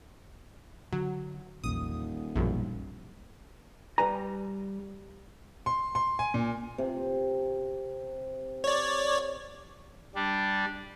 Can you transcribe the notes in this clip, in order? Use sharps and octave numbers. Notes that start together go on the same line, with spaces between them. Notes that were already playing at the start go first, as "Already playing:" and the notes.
D3 F#3
D#1 A#1 E2 D#6
A#1 F#2 B2 G3
G3 B4 G#5 A#5
C6
C6
G#5
A#2
C3
C#5 D5
G3 D4